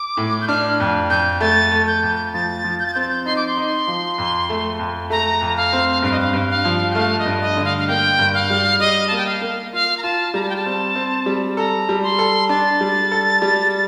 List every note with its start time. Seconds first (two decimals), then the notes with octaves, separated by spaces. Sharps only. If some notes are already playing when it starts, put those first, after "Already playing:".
Already playing: D6
0.17 A2
0.41 G6
0.48 D4 F6
0.80 F2
1.10 F2 G6
1.40 A3 A6
1.72 A3
1.87 G6
2.03 F2
2.33 F3 A6
2.64 F3
2.79 G6
2.87 A6
2.94 C4 G6
3.01 A6
3.09 G6
3.26 D#4 C6
3.36 D6
3.47 C6
3.57 D#4
3.87 F3
4.18 F2
4.49 A3
4.79 F2
5.10 A3 A#5
5.41 F2
5.57 F5
5.73 C4
6.02 G2 F5
6.12 D#5
6.20 F5
6.33 G2
6.49 F5
6.65 F3
6.91 G5
6.95 A3 F5
7.19 D#5
7.26 G2
7.41 D#5
7.57 D3
7.65 F5
7.78 F5
7.87 A#3 G5
8.19 G2
8.34 F5
8.50 G3
8.80 G3 D#5
9.08 A#3 A5
9.17 G5
9.26 F5
9.41 A#3
9.73 F4 F5
9.98 A#5
10.03 F4 A5
10.34 G3 A#5
10.42 A5
10.49 G5
10.56 A5
10.66 C4
10.95 C4
11.26 G3
11.57 A4 A#5
11.89 G3
12.03 C6
12.19 A4
12.49 D4 A6
12.81 G3
13.12 A4
13.42 G3